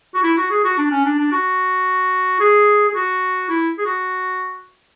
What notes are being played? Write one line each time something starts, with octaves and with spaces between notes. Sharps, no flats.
F#4
E4
F#4
G#4
F#4
D4
C#4
D4
D4
F#4
G#4
G#4
F#4
E4
G#4
F#4